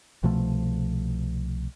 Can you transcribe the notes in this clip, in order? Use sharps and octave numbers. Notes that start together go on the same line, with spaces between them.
C2 B2 F3 A3